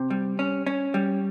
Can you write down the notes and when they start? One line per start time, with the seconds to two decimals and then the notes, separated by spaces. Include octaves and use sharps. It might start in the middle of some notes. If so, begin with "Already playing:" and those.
Already playing: C3
0.10 G3
0.39 C#4
0.66 C#4
0.94 G3